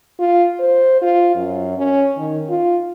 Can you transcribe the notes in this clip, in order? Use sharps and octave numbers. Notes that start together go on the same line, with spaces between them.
F4
C5
F4
F#2
C#4
D#3
F4